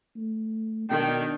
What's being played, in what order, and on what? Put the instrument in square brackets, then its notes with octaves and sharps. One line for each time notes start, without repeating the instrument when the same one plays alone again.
[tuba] A3
[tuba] B2 [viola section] D#3 D4 [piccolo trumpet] G5